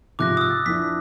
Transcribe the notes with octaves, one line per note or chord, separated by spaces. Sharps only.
G#2 C3 F3 D6 F#6 A#6
D#6 E6
A6
F2 E3 D4 B6